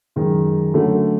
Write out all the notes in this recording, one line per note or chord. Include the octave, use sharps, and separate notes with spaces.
F#2 D#3 G#3
D3 F#3 A3 C#4